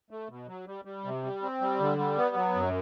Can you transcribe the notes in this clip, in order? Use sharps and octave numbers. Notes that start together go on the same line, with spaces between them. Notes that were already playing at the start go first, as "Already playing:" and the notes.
A3
B2
F#3
G3
G3
C3
G3
C4
G3
D3
G3
B3
F#3
F#2